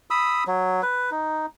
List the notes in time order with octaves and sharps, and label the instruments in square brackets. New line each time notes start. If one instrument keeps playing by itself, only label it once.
[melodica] B5 D#6 E6
F#3
B4
D#4